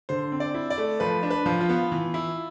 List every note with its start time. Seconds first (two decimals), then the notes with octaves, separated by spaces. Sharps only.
0.09 D3 C5
0.32 C4
0.40 D5
0.55 E4
0.70 D5
0.78 A3
1.00 F3 B4
1.23 D4
1.30 B4
1.46 F3
1.61 F4
1.69 B3
1.92 E3
2.14 E4